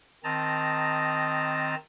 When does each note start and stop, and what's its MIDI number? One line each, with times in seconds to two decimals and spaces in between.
0.24 1.75 51
0.24 1.75 60
0.24 1.75 75
0.24 1.75 81
0.24 1.75 82